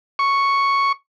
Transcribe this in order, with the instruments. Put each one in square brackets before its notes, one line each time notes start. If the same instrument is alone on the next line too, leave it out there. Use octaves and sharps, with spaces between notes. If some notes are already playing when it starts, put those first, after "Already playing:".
[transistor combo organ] C#6